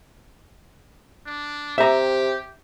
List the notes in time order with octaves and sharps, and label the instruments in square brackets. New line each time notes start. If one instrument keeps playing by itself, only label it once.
[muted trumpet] D4
[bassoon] C3 [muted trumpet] G4 [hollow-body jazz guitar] E5 A#5